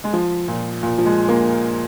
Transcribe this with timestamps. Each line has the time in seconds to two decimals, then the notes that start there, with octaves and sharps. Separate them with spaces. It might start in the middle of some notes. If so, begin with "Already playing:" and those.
0.04 G#3
0.13 F3
0.48 A#2
0.83 A#2
0.98 F3
1.06 G#3
1.29 A#3